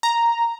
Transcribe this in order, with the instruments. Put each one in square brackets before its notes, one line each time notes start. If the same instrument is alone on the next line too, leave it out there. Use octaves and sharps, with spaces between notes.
[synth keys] A#5